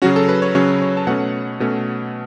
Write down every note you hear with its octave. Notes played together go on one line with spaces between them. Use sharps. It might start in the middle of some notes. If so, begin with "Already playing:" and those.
C#3 F#3 C#4 F#4
A4
B4
C#5
C#3 F#3 C#4 C#5
C#5
A5
B2 A3 C#4 F#5
B2 A3 C#4